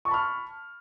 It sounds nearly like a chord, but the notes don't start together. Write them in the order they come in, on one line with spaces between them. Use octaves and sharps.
C#6 A5 B5 F6